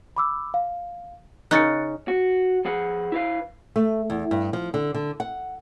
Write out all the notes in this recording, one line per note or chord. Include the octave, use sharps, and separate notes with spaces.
B5 D6 E6
F5
C#3 C#4 D#4 F#6 A6 C#7
F#4
F3 G#4 F#5
E4 B4 F5
A3
E2
G2
F3
D3
D3
F#5